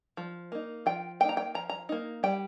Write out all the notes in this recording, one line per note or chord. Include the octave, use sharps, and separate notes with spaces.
F3
A#3 D#4
F3 G5
A#3 D#4 G5 A#5
G5
F3 A#5
A#5
A#3 D#4
G3 G5